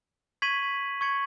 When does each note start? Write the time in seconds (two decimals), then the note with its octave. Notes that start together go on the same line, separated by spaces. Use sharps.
0.42 C#6 G#6 B6 D#7 F#7
1.01 C#6 G#6 C#7 F#7